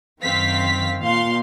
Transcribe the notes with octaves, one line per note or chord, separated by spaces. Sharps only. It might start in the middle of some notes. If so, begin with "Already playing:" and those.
F#2 D#3 C4 F5 B6
A#2 F5 C6